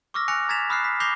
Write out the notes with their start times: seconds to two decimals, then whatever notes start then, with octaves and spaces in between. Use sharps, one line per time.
0.14 C#6 D6 E6 F6 A#6
0.28 G#5 F#6 A#6 C#7 F7
0.49 A#5 G#6 A6 B6 E7 F7
0.70 B5 D#6 F6 F#6 C7
0.84 B6
1.00 D6 G6 A#6 C7 F7 G7